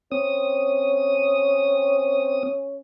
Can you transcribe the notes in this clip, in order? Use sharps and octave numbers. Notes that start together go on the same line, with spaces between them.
C4 C#4 D#6